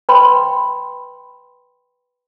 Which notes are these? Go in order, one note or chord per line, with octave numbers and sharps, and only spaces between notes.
B4 G5 B5 C6